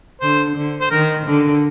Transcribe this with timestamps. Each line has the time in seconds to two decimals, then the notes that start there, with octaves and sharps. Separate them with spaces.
0.21 D3 C5
0.56 D3
0.81 C5
0.91 D#3 A#4
1.26 D3